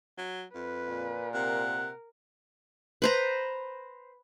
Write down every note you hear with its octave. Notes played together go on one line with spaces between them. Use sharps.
F#3
F2 B4
A#2
C3 A#4 F#5
B4 C5 A#5